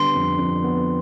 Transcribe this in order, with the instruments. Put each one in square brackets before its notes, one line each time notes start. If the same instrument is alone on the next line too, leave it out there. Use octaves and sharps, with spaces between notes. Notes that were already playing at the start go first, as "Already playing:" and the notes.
Already playing: [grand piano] D3 G3 B3 [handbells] C6
[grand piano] F2
F2
B3